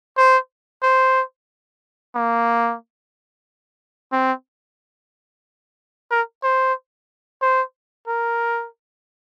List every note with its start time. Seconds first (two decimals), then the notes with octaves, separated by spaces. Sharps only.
0.17 C5
0.82 C5
2.15 A#3
4.12 C4
6.11 A#4
6.43 C5
7.42 C5
8.07 A#4